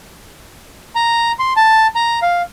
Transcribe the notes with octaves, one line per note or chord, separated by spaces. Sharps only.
A#5
C6
A5
A#5
F5